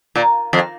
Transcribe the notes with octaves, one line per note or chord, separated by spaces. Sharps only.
A#2
F2